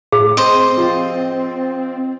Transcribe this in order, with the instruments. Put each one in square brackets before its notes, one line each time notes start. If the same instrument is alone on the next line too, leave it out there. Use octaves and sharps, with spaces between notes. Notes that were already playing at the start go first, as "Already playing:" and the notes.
[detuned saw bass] A2 [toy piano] G#4
[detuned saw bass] C4 [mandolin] C5 D#5
[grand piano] F3 F4 [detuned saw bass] C4